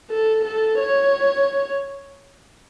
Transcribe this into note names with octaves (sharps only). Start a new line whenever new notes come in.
A4
A4
C#5